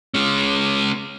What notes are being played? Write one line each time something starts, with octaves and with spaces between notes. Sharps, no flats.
G#3 C#4